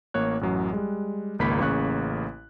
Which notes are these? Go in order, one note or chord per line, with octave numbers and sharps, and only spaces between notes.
A1 A#3 C#5 F#6
A1 F#2 F#3
G3 G#3
G#1 C#2 A#3 B5 B6
A1 C#3 A#3 C#6 F#6